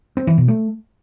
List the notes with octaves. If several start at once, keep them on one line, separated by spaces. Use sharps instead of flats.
C4
E3
B2
A3